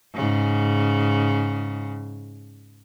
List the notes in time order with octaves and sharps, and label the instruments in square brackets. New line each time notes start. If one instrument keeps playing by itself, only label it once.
[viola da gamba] G#2 C#3